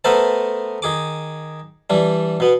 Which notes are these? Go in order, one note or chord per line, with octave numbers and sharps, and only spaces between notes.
A3 B3 A#4 C5 E5 A5
D#3 G#4 D6
E3 G3 D4
B2 B3